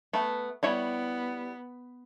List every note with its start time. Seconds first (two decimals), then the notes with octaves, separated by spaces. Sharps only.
0.13 A3 B3
0.63 G3 B3 E4 C#5